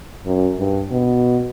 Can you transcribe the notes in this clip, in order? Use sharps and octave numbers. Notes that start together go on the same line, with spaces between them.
F#2
G2
B2